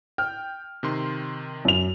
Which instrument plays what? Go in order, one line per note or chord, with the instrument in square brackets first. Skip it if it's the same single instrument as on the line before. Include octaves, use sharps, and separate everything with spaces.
[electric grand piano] G5 [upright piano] F6
[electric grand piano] C3 D#3 C6
[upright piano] F#2 F7